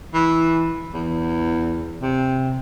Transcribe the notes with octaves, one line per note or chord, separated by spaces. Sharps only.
E3
E2
C3